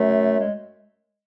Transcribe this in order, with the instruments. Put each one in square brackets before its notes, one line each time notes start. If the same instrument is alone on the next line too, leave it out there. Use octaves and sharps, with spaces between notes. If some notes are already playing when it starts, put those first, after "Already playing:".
Already playing: [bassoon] F#2 [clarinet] A3
[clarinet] G#3